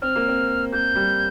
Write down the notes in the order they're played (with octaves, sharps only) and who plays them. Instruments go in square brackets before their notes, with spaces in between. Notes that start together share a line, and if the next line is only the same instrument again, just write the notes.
[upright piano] C4 [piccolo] F6
[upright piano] A#3
C4
[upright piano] A#3 [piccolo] G6
[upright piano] G3